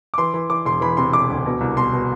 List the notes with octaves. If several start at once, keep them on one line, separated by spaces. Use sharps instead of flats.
D6
E3 C6
E3
E3 D6
E1 C6
E3 B5
C3 C6
E1 D6
D2
B2
C2
B2 C6
B2